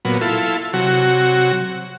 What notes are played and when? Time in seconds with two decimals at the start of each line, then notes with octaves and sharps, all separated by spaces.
0.05 A#2 F#3 B3
0.21 E4 F4 A4
0.73 C3 F#3 F#4